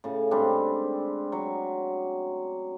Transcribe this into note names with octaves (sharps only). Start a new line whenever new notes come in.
A2 C#3
G#2 G3 C4 D4
F#3